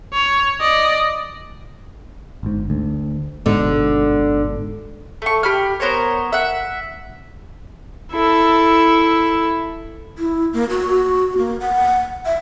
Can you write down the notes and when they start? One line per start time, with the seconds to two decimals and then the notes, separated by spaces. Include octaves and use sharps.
0.13 C#5
0.60 D5 D#5
2.43 G1 G#2
2.70 D2
3.46 G1 G#2 B2 D3
5.22 A3 C#6
5.43 G4 B5 F6
5.80 B3 A#4 C5 C#5
6.32 E5 F#5
8.12 E4 A4
10.18 E4
10.53 A#3
10.70 F#4
11.38 A#3
11.60 F#5
12.26 E5